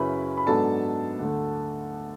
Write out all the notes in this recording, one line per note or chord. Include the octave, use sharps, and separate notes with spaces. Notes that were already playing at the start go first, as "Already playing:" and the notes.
Already playing: F#2 C#3 F#3 C#4 E4 B4 B5
B5
G#2 F#3 B3 D4 A4 A5
D2 D3 A3